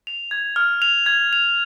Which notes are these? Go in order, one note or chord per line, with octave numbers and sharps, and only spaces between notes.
F7
G#6
F6
F7
G#6
F7